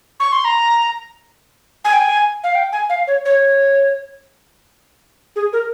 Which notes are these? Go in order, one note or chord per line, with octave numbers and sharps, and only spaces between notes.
C#6
C6
A#5
G#5
G5
G#5
F5
G5
G#5
F5
C#5
C#5
G#4
A#4